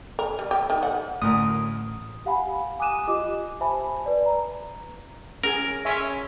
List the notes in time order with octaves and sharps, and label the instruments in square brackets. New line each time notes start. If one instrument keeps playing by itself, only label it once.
[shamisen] A#4
G3
G4
D#3
F#5
[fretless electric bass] A1 A2 [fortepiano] D2 A#4 [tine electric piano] D#6
[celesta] G4 F5 F#5 G#5 B5
G#5 D6 D#6 F#6 D#7 E7
F4 G4 D#5 D6
C5 E5 G#5 A5 B5
B4 D5
A#5
[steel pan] C#4 G#4 G#5 [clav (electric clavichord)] A#4
[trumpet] C#4 [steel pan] E5 G#5 C6